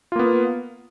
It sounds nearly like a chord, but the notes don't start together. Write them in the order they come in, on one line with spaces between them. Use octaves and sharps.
F4 A#3 B3